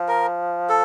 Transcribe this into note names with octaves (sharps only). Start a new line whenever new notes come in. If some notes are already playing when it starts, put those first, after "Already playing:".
Already playing: F3
A#4
A4